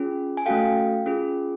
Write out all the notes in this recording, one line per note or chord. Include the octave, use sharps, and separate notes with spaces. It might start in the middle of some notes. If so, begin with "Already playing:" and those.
Already playing: C#4 F4 G#4
G#5
A3 C#4 F#4 A4 F5 G5
C#4 F4 G#4